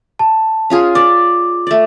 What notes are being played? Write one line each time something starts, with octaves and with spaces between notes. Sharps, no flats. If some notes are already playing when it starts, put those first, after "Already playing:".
A5
C#4 F4 G#4
D5 D6
A3 D5